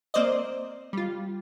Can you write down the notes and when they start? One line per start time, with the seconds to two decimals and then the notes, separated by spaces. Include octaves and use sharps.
0.14 A#3 C4 C5 D5 D#5
0.93 G3 F4